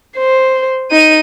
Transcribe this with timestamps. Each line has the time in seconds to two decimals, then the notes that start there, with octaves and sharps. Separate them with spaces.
0.17 C5
0.91 D#4 D#7